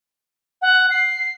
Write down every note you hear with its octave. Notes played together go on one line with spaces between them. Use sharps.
F#5
C7